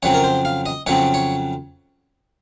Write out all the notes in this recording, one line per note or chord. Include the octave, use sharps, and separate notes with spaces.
F2 C#3 F#3 C4 C#5
A#4
C5
F5
D#5
F2 C#3 F#3 C4 C#5
C#5